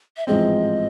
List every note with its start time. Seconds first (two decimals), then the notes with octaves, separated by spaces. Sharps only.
0.17 E5
0.27 A1 G#2 F3 G#3 C4 D#5